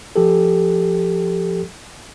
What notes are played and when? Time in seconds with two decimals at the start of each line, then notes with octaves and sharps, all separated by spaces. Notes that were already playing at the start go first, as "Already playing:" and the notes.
0.16 F3 G4 A4